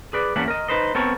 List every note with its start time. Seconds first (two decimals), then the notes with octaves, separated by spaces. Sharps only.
0.13 G#4 B4 D5
0.36 E2 A#3 C#4 D4 E5 F#5
0.48 A#4 D#5
0.68 D#4 B4 C5 D#5
0.95 B3 C4 A4 A#4 C#5